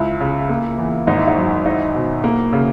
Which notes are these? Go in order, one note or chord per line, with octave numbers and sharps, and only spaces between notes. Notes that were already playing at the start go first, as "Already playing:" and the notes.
Already playing: C#2 E4
C#3
A#3
E2
G#1 D#4
E4
D#4
F#2
D#4 E4
B2
A#3
C#3